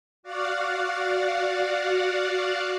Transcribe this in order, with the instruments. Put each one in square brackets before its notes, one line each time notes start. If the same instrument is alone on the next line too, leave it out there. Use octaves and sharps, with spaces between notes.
[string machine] F#4 D5 F5 F#5